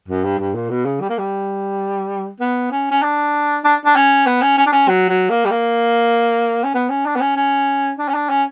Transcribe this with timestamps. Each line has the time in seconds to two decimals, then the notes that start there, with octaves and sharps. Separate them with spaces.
0.08 F#2
0.24 G2
0.39 G2
0.55 A#2
0.70 B2
0.85 C#3
1.01 G3
1.10 A#3
1.18 G3
2.40 B3
2.71 C#4
2.91 C#4
3.02 D4
3.64 D4
3.85 D4
3.96 C#4
4.26 B3
4.42 C#4
4.58 C#4
4.66 D4
4.73 C#4
4.88 F#3
5.09 F#3
5.30 A#3
5.45 G3
5.51 A#3
6.64 C#4
6.74 B3
6.90 C#4
7.06 D4
7.16 B3
7.21 C#4
7.36 C#4
7.99 D4
8.08 C#4
8.14 D4
8.29 C#4